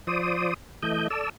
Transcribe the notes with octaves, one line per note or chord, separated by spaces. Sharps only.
F3 C5 D5 D#6
E3 A3 D#5 G6
A4 D5 E6